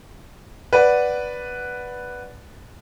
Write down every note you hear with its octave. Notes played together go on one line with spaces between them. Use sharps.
B4 D5 F#5